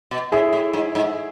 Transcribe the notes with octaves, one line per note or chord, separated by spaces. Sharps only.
B2
A2 E4 G#4
A2
G#2
G#2